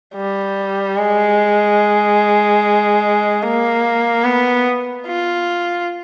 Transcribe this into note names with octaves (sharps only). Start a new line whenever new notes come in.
G3
G#3
A#3
B3
F4